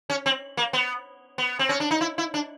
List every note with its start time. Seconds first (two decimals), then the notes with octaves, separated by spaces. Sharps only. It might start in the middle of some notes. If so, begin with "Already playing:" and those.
0.10 C#4
0.26 C4
0.57 A#3
0.73 B3
1.38 B3
1.59 C4
1.69 C#4
1.80 D4
1.91 D#4
2.01 E4
2.18 E4
2.34 D4